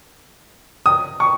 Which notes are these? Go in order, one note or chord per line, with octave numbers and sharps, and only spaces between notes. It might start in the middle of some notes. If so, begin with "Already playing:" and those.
D#6
C#6